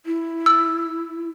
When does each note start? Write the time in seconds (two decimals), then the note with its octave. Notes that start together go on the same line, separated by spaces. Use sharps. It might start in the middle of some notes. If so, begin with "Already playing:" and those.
0.06 E4
0.46 E6